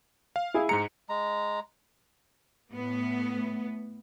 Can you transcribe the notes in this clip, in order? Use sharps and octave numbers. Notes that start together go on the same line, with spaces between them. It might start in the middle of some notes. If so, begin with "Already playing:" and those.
F5
E4 G#4
G#2 G#3 A#5 C#7
G#3 A#5
A2 B3